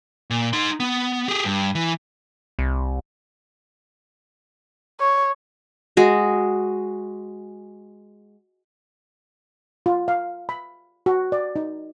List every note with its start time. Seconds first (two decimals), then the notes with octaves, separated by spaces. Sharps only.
0.30 A#2
0.53 D#4 C6
0.80 B3
1.28 G4 G#4
1.45 G2
1.75 E3
2.59 C2
5.00 C#5
5.97 G#3 F#4
9.86 F4
10.08 F5
10.49 B5
11.06 F#4
11.32 D5
11.56 D#4